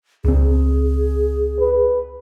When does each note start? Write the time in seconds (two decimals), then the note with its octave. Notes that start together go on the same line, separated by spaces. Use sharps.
0.25 C#2 C4 G#4
1.60 B4